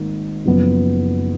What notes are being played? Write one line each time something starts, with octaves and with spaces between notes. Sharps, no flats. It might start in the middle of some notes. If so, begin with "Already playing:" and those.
Already playing: G#1 G#2 D#3 A#3
F#1 F#2 F3 B3